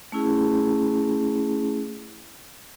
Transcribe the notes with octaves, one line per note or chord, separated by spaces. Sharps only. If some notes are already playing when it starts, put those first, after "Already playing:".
A3 C#4 E4 G#4